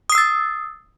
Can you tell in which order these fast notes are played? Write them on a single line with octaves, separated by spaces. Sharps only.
D#6 C7 E6 A6